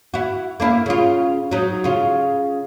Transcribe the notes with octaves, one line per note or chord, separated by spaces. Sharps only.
E4 F#4
A#3 D4 E4
C#3 F4
F#3 D#4
C#3 F4